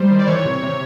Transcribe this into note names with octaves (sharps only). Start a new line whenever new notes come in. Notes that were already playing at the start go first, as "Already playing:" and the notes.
Already playing: G3 C5
D#3
D5
E3 C#5
C3
C3